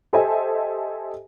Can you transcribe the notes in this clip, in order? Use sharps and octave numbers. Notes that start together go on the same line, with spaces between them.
G4 A4 C5 D#5 E5 G#5